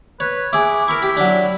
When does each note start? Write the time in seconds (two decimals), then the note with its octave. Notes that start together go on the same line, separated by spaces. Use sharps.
0.20 B4 C#5
0.53 E4 G#4 D6
0.88 E4 A#4 C#6
1.02 G4
1.17 F#3 D4